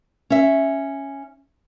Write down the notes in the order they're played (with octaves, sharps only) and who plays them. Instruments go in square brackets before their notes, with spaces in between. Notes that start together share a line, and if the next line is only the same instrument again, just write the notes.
[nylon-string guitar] C#4 E5